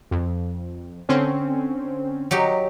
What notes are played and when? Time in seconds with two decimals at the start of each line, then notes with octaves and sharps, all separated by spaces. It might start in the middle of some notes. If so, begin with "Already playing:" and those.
0.11 F2
1.09 D3 C4 C#4
2.31 F#3 D#4 G4